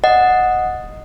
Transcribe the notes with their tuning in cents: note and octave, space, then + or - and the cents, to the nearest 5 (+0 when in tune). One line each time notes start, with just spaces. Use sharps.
D#5 -5 F#5 -5